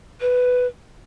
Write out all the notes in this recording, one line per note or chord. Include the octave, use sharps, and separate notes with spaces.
B4